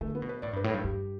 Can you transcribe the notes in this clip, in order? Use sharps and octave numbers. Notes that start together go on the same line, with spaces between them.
D3 A3
B3
B2
B4
A2 D5
G2 B4
A2
A4
G2
G2 G4